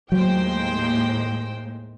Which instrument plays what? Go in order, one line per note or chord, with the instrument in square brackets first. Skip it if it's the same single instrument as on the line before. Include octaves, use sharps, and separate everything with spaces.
[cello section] D#2 A2 G#3 [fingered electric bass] F#3 [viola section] C5 G5